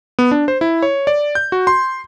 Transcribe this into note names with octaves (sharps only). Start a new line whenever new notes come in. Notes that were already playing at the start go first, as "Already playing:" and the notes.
B3
D4
C5
E4
C#5
D5
G6
F#4
C6